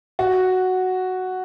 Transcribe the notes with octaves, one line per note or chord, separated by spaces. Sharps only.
F#4